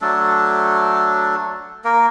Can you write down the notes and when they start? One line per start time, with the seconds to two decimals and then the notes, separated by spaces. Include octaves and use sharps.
0.01 F#3 A3 D4 A4
1.84 A#3 A#4